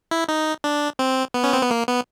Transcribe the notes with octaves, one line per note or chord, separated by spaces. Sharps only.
E4
D#4
D4
C4
B3
C#4
C4
B3
A#3
B3